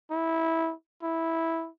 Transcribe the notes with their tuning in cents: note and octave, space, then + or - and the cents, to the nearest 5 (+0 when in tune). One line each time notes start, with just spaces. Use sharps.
E4 -15
E4 -10